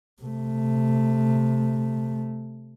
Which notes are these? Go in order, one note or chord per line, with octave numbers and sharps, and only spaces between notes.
C3 A3